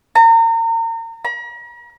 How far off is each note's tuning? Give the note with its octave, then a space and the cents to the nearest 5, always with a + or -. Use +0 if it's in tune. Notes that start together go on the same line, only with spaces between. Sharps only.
A#5 -35
A#5 +45